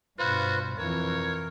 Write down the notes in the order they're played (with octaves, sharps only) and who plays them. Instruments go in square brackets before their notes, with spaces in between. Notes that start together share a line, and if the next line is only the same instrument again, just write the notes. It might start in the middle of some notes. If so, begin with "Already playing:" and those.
[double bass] G2 B2 [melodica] F4 B4 C5 [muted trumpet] F#4
[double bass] F2 E3 [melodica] A#4 [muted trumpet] C#5